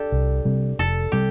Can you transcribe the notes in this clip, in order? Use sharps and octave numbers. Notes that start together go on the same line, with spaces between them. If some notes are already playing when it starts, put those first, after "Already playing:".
Already playing: D4 G4 A4
C2
C3 G3
F1 A4
C3 G3 G4